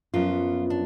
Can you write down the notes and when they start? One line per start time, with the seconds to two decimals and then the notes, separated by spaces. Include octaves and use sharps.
0.14 F#2 F3 B3 F4
0.70 D4